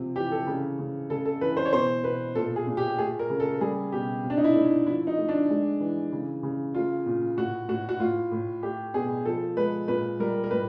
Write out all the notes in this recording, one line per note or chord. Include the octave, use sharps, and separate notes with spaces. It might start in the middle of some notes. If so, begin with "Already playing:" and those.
Already playing: C3 F3
E3 G4
A4
C#3
C#3
C#3 A4
A4
E3 B4
C5
C#5
B2 C5
B2 B4
A#2 A4
G#4
A#2
G4
A3 G#4
A#4
C#3
A4
G3 G#4
B2 G4
C3
D4
D#4
E4
A3
E4
F3 E4
D#4
A3
D4
G#3
E3
C#3
C#3
A3 F4
A#2
A2 F#4
A2 F#4
F#4
A2 F4
A2
A3 G4
B2 G#4
F3 A4
G#3 B4
A#2 B4
G3 A#4
A#4
A2 B4